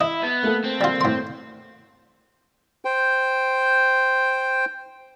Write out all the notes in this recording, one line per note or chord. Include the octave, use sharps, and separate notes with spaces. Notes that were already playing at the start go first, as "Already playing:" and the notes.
E4 D#5 E5
B3
A3 A#3 A4
C4
G3 F4
A2 C6
C5 G5